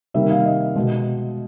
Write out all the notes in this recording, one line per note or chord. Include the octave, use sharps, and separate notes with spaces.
C3 D#3 G3 A#3 E5
F5
D#5
B2 G#3